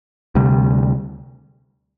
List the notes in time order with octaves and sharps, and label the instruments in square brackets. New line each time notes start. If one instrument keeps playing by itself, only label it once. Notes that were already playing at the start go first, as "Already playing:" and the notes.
[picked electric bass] D2 C3 G3